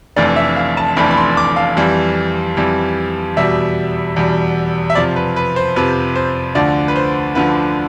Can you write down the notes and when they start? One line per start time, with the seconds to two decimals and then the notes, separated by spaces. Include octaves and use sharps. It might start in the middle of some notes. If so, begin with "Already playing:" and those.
0.16 F1 F2 E3 A3 D4 D5
0.36 E5
0.56 F5
0.77 A5
0.96 F1 F2 E3 A3 D4 B5
1.11 B5
1.17 C6
1.37 D6
1.56 F5
1.77 F2 E3 G3
2.57 F2 E3 G3
3.36 E2 B2 G3 E5
4.16 E2 B2 G3
4.90 E5
4.95 F2 C3 F3 D5
5.16 B4
5.36 B4
5.56 C5
5.76 F2 C3 F3 B4
6.15 C5
6.55 D2 D3 F3 D5
6.88 B4
6.96 C5
7.35 D2 D3 F3 B4